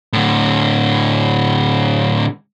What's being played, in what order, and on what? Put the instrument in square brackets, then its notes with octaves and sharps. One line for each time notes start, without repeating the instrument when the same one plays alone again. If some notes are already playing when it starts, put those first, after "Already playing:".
[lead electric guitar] A2 D3